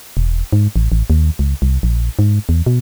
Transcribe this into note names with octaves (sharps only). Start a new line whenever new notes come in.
E1
G#2
A1
A1
D#2
C#2
C2
A#1
G#2
E2
B2